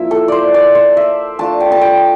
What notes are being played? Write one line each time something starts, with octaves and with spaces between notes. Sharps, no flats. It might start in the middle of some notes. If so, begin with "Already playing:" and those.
Already playing: F3 A#3 E4 E5
A4
C5 D5
D5
C5
E5
A3 D4 F4 A5
G5
A5
G5